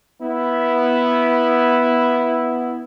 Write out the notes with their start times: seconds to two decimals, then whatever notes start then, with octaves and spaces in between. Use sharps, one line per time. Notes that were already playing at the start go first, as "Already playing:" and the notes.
0.22 B3 E4